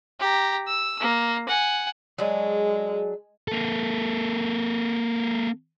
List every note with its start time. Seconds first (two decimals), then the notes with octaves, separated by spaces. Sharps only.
0.20 G4 A#5
0.67 E6
1.00 A#3
1.48 F#5 G#5
2.18 F#3 G#3 D4 G#4
3.48 A#3 A4